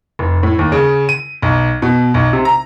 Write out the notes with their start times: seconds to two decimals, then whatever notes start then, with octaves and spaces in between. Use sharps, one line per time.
0.19 F1
0.43 A2
0.59 D#2
0.72 C#3
1.09 D#7
1.42 B1
1.82 B2
2.14 B1
2.33 C3
2.45 A#5